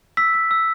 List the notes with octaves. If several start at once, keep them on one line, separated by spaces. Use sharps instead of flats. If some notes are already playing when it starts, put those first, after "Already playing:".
E6 B6
E6
E6